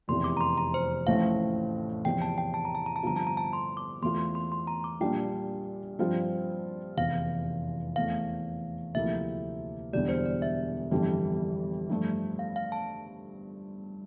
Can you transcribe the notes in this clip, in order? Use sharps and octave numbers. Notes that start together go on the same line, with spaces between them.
F1 E2 C3 C6
D6
A#5
C6
A#5
C5
A1 A2 F3 A3 C4 F5
E2 C3 F3 G5
A5
G5
A5
A#5
A5
A#5
A5
G1 G2 F3 C4 F4 A#5
A5
A#5
A5
C6
D6
E2 E3 A3 C4 F4 C6
C6
C6
C6
A#5
D6
A#1 A#2 G3 D4 F4 G5
G2 F3 C4 F4
F1 E2 E3 F5
E2 E3 A3 C4 F5
D2 C3 F3 A#3 E4 E5
E1 E2 D3 G3 D5
C5
D5
E5
G1 F2 E3 G3 D4
G2 F3 A3
F5
F5
A5